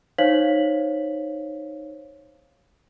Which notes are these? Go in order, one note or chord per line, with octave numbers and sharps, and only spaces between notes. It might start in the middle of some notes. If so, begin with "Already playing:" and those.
D#4 C5 C#5 F5 B6 F#7